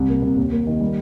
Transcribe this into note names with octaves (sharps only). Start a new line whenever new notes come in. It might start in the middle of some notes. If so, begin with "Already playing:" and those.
Already playing: C2
A#3
C2
D#2
A#3
D#3
G3